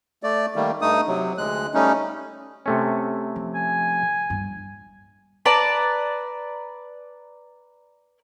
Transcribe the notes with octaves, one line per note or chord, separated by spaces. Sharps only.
A3 D5
D#3 G3 A3 A#3
G2 A3 D#4 D#6
C3 F#3
D2 G#3 F#6
G3 A3 C#4 D#4
C3 A3 C#4
F3
G#5
G2
B4 D5 A5 A#5